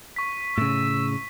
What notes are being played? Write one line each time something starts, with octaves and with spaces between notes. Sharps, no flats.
C#6 B6
A2 C#3 E6